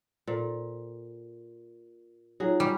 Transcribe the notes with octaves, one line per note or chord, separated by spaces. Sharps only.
A#2 A4 C5
F#3 D#4 F4 G#4 C#5
G3 C#4